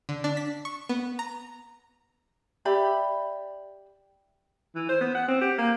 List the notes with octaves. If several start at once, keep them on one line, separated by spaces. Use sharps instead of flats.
D3
D4
B6
C#6
B3
A#5
G4 D5 E5 B5
E3
C5
B3
F#5
C4
G4
A#3